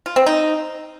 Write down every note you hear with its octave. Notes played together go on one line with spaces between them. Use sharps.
F4
C4
D#4